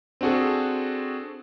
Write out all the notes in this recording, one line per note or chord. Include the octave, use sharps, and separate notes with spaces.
C4 D4 F#4 G#4 A4